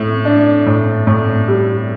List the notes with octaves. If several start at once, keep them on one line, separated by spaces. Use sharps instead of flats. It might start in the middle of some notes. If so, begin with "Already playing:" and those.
Already playing: A2
D4
A2
A2
G3